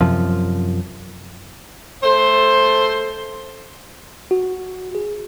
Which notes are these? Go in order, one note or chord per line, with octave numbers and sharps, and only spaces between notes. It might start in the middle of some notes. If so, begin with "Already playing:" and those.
F#2 C3 F3
A3 A4 C5
F#4
G#4